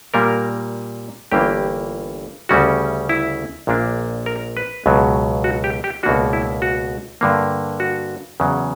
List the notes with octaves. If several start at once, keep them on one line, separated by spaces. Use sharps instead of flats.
A#2 G3 A#3 A#4
G1 G2 E3 A#3 G4
D2 C#3 G3 C#4 F#4
E4
A#1 A#2 A#3 D4
A#4
B4
C#2 B2 F#3
F#4
G4
G4
C#2 B2 A#3 D4 F#4
E4
F#4
G2 D3 A#3
F#4
E2 C#3 F#3